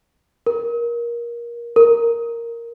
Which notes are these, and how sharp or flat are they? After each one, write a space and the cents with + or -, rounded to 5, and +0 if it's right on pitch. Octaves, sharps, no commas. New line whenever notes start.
A#4 +20
A#4 -5